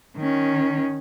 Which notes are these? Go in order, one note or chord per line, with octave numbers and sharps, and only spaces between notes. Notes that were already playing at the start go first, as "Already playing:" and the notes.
D#3 C#4